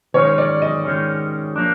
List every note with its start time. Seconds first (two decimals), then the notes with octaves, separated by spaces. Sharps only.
0.14 D#3 G#3 C#4 C#5
0.38 D5
0.62 D#5
0.85 D#3 G#3 C#4
1.56 F3 A#3 D4